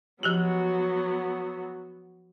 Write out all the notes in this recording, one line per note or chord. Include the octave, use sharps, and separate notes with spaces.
F3 F#3 B3 F#4 G4